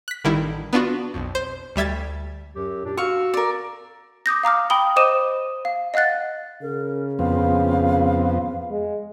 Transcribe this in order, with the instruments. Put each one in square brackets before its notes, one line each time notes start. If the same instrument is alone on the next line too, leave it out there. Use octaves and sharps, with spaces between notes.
[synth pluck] F#6 B6
A1 D3 D#3 G3 E4
B3 D4 F4 F#4
B1 F2
C5
D2 G3 E5 G#6 A6
[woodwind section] F#2 F#3 G4
A#2 D4 G4
[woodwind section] F#4 E6 [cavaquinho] F5 C#6
[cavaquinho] A#4 D5
[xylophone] D6 D#6 G6 A#6
F5 A#5 D6 F6
G5 B5 D#6 G7
C5 D#5 D6 D#6 D#7 E7
F5
D#5 F5 F#5 F#6 A6
[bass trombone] C#3 [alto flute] A#4
[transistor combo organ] F2 B3 C4 [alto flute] F5
[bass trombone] G#3